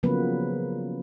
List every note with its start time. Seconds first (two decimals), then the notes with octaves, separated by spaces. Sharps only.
0.03 C#3 F3 F#3 A#3 B3 B4